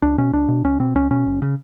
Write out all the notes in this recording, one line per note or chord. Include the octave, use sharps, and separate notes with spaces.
C#2 D4
B2 C#4
C#2 D4
B2
C#2 C#4
B2 C4
C#2 C#4
B2 C#4
F#1
C#3